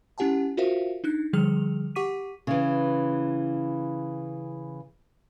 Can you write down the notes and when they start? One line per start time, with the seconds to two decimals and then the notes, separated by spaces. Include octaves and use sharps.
0.18 C#4 E4 G4 F#5 G#5 A5
0.57 F4 F#4 A#4 C5 E5 F5
1.04 D4 D#4 F#6
1.33 D3 F3 G3 G#4 F6 F7
1.95 G4 F#5 C#6 D6 B6 D#7
2.47 C#3 E3